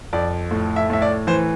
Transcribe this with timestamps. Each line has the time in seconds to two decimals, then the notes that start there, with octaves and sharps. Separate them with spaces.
0.13 F2 D5
0.51 A2
0.76 E5
0.90 A2 E5
1.02 D5
1.27 E3 C5